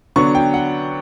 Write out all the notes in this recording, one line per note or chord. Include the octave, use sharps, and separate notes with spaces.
D3 F#3 B3 D4 C#6
G5
F#5